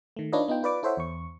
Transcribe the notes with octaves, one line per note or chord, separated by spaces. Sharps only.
D#3 A3
D4 D#4 F4 B4 C#5 D#5
B3 D#4 F4 G5
F4 B4 D5 D6
E4 A4 C5 C#5 E5 F#5
E2 C#6